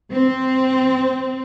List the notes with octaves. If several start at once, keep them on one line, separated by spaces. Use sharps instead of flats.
C4